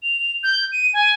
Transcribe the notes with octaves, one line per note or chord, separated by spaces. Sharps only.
F7
G6
D#7
G#5